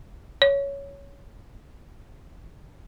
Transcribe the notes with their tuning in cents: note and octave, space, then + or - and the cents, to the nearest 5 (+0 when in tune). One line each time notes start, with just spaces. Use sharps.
C#5 +10